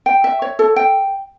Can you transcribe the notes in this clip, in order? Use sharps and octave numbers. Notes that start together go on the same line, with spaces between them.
G5
E5
C#5
A4
G5